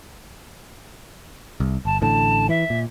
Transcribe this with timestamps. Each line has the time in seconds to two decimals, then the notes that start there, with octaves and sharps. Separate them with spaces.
1.60 C2
1.85 G1 A5
2.01 A1 A2 D3 A5
2.49 E3 E5
2.70 A#2